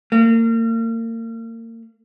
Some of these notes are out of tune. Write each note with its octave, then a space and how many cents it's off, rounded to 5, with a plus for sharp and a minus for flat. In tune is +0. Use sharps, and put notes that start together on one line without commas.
A#3 -35